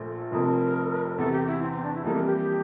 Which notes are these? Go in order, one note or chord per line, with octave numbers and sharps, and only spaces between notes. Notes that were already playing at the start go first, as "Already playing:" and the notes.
Already playing: A#1 A#2 A3
A4
F1 F2 C3 F3 A#4
E2 C3 E3 A4
G4
E4
C4
C4
D4
E4
F2 E3 G3 A#3 A4
A#4
G4
G4